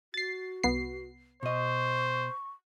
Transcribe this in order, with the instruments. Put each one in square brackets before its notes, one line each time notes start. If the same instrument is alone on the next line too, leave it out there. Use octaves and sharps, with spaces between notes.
[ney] F#4 [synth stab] A6 C7
[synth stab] C2 B3 C7
[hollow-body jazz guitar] B2 D#5 [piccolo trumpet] C5 [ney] C#6